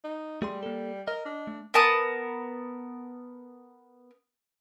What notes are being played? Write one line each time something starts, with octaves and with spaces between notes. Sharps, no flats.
D#4
G3 A3 G#4 C6
A#3 A4
A#4 D#5
D4
A3
B3 A#4 A5 D#6